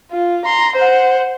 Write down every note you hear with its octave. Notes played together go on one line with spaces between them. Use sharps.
F4
A#5 C6
C5 F#5